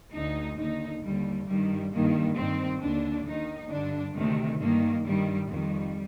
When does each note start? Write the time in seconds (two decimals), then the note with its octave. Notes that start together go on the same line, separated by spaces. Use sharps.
0.14 D2 D3 D#4
0.58 D#2 D3 D#4
1.02 D#2 D3 G3
1.47 G2 D#3 G3
1.92 G2 D#3 A#3
2.37 G2 D#3 C4
2.81 D#2 D3 D4
3.26 D#2 D#3 D#4
3.70 G2 D3 D4
4.15 D2 C3 D#3 A3
4.59 G2 D#3 A#3
5.04 G2 D#3 G3
5.49 F2 D#3 G3